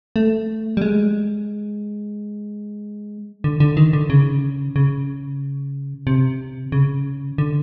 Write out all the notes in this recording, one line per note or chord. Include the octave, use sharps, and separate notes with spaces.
A3
G3
G#3
D3
D3
D#3
D3
C#3
C#3
C3
C#3
D3